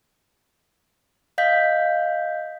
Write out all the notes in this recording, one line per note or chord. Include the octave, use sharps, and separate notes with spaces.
D#5 F5 G6 B6